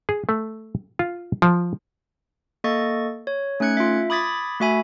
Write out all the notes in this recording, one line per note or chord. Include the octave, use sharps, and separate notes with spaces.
G#4
A3
F4
F3
A#3 A4 D#5 C#6 A6
C#5
A3 C#4 D#4 F#6 G#6 C#7
F4 E5
B5 D6 D#6 G#6 A6 B6
A3 F#4 E5 G#5 B5